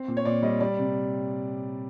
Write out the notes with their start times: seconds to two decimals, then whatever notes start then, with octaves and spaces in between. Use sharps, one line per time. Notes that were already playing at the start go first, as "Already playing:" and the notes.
Already playing: C4
0.08 A#2
0.17 C#5
0.25 A#2 D5
0.43 G3 D#5
0.60 G3 D5
0.78 C3